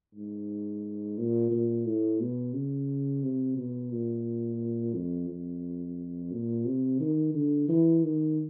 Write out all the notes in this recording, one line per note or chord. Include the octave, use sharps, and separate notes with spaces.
G#2
A#2
A#2
A2
B2
C#3
C3
B2
A#2
F2
F2
A#2
C3
D#3
D3
E3
D#3